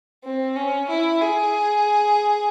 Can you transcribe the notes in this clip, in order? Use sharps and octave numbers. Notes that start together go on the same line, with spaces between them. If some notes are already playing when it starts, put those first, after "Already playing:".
C4
C#4
E4
G#4